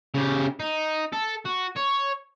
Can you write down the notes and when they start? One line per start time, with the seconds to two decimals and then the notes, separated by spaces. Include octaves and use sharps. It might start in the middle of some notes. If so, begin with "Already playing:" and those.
0.14 C#3 G4
0.60 D#4
1.13 A4
1.45 F#4
1.76 C#5